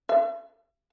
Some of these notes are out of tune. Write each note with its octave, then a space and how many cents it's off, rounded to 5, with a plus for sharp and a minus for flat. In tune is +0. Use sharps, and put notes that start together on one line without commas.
E5 +45